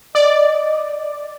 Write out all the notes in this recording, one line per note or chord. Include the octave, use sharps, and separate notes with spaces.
D5 D#5